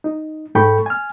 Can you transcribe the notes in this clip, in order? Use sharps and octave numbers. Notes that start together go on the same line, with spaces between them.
D#4
G#2 A4 G5 B5 C#6
G#5 F6